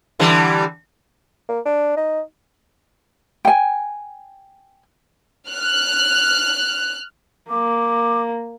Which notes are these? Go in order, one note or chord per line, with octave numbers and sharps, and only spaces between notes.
D3 E3 G3
A#3
D4
D#4
G5 G#5
F6 F#6
A#3 D6